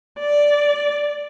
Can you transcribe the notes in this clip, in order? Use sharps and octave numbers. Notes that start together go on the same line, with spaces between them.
D5